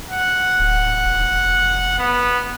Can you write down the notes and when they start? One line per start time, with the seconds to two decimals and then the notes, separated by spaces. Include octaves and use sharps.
0.10 F#5
0.59 D1
1.05 F1
1.99 B3